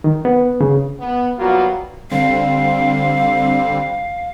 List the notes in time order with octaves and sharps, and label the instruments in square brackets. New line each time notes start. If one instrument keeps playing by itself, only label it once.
[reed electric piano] D#3
B3
C#3
[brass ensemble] B3
F#3 G3 A#3 B3 F4 F#4
[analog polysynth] D3 G3 C4 [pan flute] F5